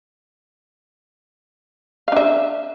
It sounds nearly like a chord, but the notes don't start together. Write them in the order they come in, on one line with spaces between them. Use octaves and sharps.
F5 D4 E5